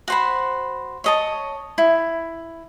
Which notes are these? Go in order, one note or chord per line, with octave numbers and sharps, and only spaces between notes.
F#4 C5 B5
C#5 D#5 A5
E4